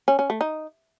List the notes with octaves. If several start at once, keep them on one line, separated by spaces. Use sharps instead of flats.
C#4
C#4
A3
D#4